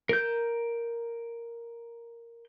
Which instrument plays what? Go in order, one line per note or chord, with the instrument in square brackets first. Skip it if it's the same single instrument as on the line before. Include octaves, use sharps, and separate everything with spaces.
[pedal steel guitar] A#4 G6